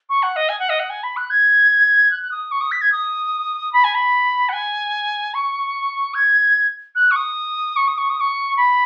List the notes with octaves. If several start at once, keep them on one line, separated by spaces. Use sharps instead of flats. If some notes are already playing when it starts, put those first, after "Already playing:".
C#6
F#5
D#5
G#5
F#5
D#5
F#5
G#5
B5
F#6
G#6
F#6
F#6
D#6
C#6
D#6
B6
G#6
D#6
B5
G#5
B5
F#5
G#5
C#6
G#6
F#6
C#6
D#6
C#6
D#6
C#6
D#6
C#6
B5